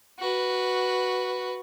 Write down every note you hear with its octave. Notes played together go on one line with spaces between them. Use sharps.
F#4 B4